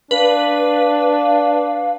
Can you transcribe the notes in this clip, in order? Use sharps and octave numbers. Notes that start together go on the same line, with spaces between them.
D4 B4 F5